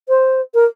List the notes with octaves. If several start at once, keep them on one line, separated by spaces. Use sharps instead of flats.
C5
A#4